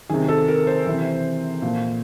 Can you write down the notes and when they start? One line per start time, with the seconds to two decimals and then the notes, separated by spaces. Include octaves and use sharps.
0.09 C3 D#3 G#4
0.28 A4
0.48 A#4
0.67 C5
0.86 C3 E3
1.62 A#2 F3